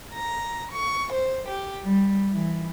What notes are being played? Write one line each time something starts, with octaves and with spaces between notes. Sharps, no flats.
A#5
C#6
C5
G4
G3
E3